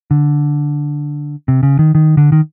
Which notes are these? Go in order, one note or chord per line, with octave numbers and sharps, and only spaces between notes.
D3
C3
C#3
D#3
D#3
D3
D#3